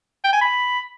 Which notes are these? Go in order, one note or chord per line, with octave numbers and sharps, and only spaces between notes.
G5
G#5
B5